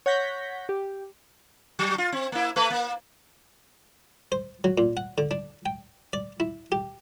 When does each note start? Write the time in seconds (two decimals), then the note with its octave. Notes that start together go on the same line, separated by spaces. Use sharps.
0.06 C#5 F#5 G6 A#6 B6
0.69 G4
1.79 F#3
1.98 F4
2.12 C4
2.32 A#3 E4
2.56 A3 B4
2.70 A#3
4.32 C5
4.64 F#3
4.78 A#2
4.97 F#5
5.18 D3
5.31 D4
5.66 G5
6.13 D5
6.40 E4
6.72 G4